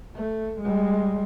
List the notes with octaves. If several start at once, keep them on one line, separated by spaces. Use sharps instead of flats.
A3
G3 G#3